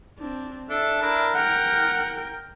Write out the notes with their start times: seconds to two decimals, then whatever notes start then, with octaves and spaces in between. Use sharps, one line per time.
0.18 C4 D4
0.69 D4 A4 E5
1.02 D4 E4 A#4
1.34 A#4 F#5 G5